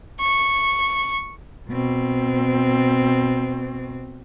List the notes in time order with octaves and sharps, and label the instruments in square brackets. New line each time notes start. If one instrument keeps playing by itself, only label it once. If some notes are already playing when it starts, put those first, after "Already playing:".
[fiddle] C#6
[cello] B2 C4